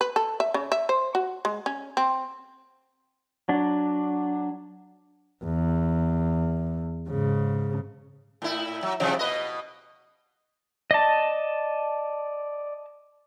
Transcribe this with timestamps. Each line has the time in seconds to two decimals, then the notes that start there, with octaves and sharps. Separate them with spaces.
0.01 B4
0.16 A4
0.40 E5
0.54 C#3
0.72 E5
0.89 C5
1.15 F#4
1.45 G#3
1.66 C#4
1.97 C4
3.48 F#3 D4
5.44 E2
7.09 G#2 C#3
8.42 A2 E4
8.83 F#3
9.00 C3 F3 G3
9.19 B2 B4 D#5
10.91 D5 D#5 A5